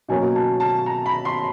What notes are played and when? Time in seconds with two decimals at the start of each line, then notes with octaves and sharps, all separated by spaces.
0.08 B2 F#3 A#3 C#4 G#5
0.35 A5
0.60 A5
0.86 A#5
1.06 B5
1.25 C6